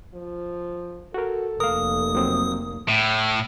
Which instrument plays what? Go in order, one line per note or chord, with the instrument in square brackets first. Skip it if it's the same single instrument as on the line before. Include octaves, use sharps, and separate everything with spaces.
[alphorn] F3
[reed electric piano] F#4 A#4 [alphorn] A4
[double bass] F1 A#3 [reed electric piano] A#4 F5 [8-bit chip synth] D#6
[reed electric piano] F#3 C4
[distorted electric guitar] A2